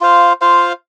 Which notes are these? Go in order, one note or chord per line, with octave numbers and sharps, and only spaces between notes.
F4 C5 F5
F4 C5 F5